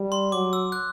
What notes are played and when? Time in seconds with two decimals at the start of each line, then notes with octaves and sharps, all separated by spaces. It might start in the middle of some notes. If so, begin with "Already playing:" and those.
Already playing: G3
0.12 C6
0.32 F#3 D6
0.53 E6
0.72 F#6